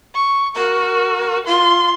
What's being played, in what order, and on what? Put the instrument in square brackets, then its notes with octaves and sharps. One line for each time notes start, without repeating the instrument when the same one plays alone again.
[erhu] C#6
[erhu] F#4 [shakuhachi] A#4
[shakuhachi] F4 [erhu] C6